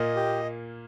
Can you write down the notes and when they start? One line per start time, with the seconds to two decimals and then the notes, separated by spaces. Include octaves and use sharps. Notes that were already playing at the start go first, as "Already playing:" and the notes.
Already playing: A#2 A#3 D#5
0.16 G4